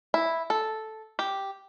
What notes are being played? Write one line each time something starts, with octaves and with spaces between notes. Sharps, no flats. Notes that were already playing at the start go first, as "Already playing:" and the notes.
E4
A4
G4